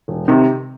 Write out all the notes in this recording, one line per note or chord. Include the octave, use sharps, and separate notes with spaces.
E1
C3 D#3